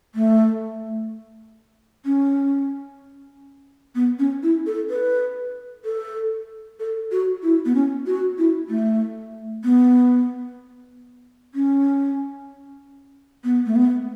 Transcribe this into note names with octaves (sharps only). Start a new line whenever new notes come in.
A3
C#4
B3
C#4
E4
A4
B4
A4
A4
F#4
E4
B3
C#4
F#4
E4
A3
B3
C#4
B3
A3
B3